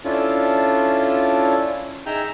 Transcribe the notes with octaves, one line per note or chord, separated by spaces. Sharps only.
C#4 D4 E4 F4 A4
D#4 G#4 E5 G5 A#5 G6